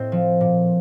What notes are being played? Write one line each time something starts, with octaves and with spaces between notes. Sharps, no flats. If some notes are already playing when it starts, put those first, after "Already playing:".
Already playing: A2 C4 D#5
F3
A#2